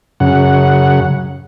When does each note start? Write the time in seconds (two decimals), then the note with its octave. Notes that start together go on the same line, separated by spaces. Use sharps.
0.20 F#2 C#3 F#5